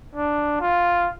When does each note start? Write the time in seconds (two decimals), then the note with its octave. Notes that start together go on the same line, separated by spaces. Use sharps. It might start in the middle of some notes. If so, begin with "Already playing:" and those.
0.15 D4
0.60 F4